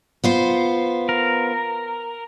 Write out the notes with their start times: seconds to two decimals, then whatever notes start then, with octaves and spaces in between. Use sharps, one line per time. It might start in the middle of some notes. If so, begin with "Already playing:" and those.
0.24 B3 F4 C5
1.09 A#4